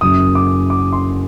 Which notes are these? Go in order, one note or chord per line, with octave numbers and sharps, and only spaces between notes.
F#1 F#2 F#3 D#6
D6
D6
C6